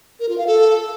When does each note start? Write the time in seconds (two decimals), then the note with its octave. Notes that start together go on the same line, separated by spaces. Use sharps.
0.20 A#4
0.29 F4
0.38 F5
0.47 A4